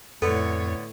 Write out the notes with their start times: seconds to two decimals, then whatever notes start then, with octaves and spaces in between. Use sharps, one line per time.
0.22 F2 A2 D3 B3 A4 C#5